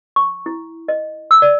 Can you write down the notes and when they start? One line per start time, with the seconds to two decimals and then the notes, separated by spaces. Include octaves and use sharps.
0.16 C#6
0.46 E4
0.88 D#5
1.31 E6
1.42 D5